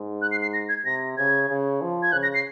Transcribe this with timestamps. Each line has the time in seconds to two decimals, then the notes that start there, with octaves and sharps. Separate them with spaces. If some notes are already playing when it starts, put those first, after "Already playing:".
Already playing: G#2
0.22 F#6
0.32 C7
0.42 C7
0.53 A#6
0.69 G#6
0.85 C3 A#6
1.17 C#3 G#6
1.49 C#3
1.81 F3
2.03 G#6
2.12 C#3 F#6
2.23 A#6
2.34 C7